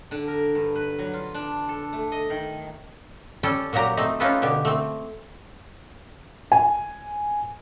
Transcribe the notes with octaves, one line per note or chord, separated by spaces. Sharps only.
D3
A#4
G2
B4
F#3
F4
D4
A4
A3
D#5
D#3
G3 C#4 A4 G5
A#2 F#3 F#4 G4 A#5
A3 C4 D#4
C#4 D#4 F4 G4 A4 B4
B2 D3 G4
A3 C4
G#5